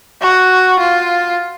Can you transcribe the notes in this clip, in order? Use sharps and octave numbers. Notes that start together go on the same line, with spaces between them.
F#4
F4